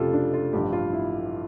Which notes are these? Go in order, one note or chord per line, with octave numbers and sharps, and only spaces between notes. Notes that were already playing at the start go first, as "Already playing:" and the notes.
Already playing: F1 F2 C#3 F4 G4 A4
D4
F4
A1 G2 F3 G4
F4
E4